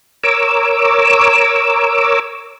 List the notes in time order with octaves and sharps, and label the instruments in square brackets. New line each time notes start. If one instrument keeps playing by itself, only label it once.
[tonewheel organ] A#4 C#5 D6 E6